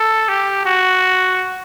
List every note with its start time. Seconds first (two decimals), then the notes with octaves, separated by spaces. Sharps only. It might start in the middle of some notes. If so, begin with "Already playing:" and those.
Already playing: A4
0.28 G4
0.65 F#4